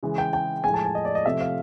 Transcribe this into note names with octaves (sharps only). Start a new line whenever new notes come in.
C#3 E3 G#3
G5
G5
A2 F3 G#3 G#5
A5
G#5
D#5
D5
D#5
C3 F3 A3 E5
F5